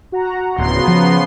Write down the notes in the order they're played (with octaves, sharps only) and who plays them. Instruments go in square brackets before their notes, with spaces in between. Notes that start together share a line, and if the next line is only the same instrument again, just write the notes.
[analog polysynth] F#4 F#5 A#5
[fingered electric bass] D1 [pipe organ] C#3 B3 C6
[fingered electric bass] F3